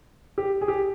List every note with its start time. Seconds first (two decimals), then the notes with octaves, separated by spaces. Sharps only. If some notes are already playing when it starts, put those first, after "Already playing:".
0.38 G4
0.61 G#4
0.68 G4